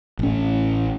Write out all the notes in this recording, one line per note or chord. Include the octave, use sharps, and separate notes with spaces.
A1 C#4